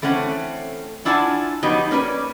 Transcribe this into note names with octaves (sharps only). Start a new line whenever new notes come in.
E3 A3 C4 C#4 F#5
D4 E4 F4 F#5 G#5 A5
F3 F#3 B3 D#4 F#4 G4
A#3 C#4 B4 D5